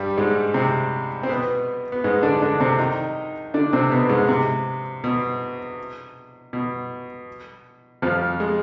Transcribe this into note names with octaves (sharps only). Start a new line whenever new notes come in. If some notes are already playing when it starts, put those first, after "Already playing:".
Already playing: G2 G3
G#2 G#3
C3 C4
C4
B2 B3
B3
G#2 G#3
D3 D4
D3 D4
C3 C4
D#3 D#4
D3 D4
C3 C4
B2 B3
G#2 G#3
C3
B2
B2
F2 F3
G#3